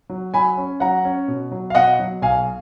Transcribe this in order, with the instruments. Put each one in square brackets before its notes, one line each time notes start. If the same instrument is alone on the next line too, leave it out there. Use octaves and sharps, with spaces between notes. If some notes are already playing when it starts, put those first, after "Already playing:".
[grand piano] F#3
F#3 G#5 B5
C#4
F#3 F#5 A#5
C#4
B2
F#3
F5
B2 D#5 F#5
F#3
B1 F5 G#5